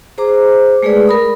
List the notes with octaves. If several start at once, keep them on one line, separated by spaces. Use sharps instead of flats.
G#4 C5 A#5 D6
G#3 A3 G#4 B4 D5
A#4 B5 D#6